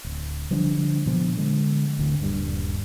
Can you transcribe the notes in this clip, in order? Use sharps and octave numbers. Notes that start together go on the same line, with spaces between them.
D1
D3 F3 G3 D4
A#2 F3 B3
D3 G#3
D1 D2
D#1 G2 C3 G3